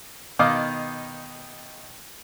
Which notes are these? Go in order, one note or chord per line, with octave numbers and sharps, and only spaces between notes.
B2 D#3 D#4 F5 D6 D#6